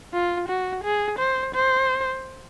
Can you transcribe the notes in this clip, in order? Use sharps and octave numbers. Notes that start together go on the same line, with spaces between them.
F4
F#4
G#4
C5
C5